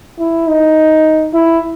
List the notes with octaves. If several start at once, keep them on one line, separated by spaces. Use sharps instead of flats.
E4
D#4
E4